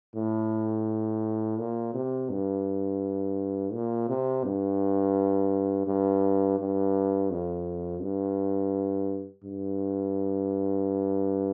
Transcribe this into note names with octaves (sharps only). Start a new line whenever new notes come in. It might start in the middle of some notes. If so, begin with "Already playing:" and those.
A2
A#2
C3
G2
A#2
C3
G2
G2
G2
F2
G2
G2